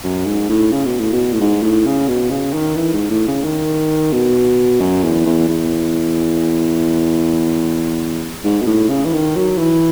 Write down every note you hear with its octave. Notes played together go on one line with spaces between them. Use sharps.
F#2
G#2
A2
C#3
B2
A2
B2
A2
G#2
A2
C#3
B2
C#3
D#3
E3
G#2
A2
C#3
D#3
B2
F#2
E2
E2
E2
G#2
B2
A2
C#3
E3
D#3
F#3
E3